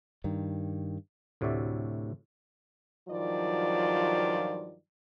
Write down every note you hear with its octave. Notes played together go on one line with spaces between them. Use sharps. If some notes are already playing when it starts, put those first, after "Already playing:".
G2 D#3
D2 A2 C3 F#4 D5 E5
G2 D#3 F3 F#3 F4 D5